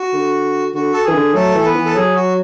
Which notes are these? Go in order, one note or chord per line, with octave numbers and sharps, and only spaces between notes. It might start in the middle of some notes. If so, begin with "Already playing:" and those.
Already playing: F#4
D3
D3 F#4
A4
E3 G#4
D3
F#3 A3 A4
E3
A4
B3 B4
E3
A4
F#3 G#4
F#4